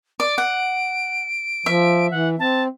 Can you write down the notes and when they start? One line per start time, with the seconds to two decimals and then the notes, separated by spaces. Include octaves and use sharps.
0.20 D5 D7
0.38 F#5
1.66 F3 E5
2.11 E3 F#5
2.39 C4 A5